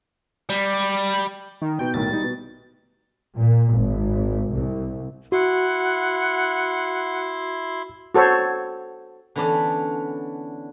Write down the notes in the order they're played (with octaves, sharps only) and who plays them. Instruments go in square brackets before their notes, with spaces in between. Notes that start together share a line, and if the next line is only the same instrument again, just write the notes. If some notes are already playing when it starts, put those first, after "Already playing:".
[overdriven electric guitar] G3
[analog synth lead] D#3
[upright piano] B2 D#4 [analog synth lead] G5
[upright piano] B1 A2 D#3 [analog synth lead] A6
[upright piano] G3 D#4
B2
[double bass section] A#2
G#1
C2
[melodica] E4 C6 [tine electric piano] F#4 [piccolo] F#5
[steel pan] F#4 A4 C5 C#5
[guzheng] D3 E3 B3 C#4 D4